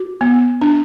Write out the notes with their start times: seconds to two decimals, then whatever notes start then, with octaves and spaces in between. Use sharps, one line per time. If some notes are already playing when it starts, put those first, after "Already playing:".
Already playing: F#4
0.21 B3
0.61 D4